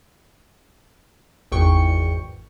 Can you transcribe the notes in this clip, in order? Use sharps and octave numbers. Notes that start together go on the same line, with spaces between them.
G#1 E2 G5 C#6 C#7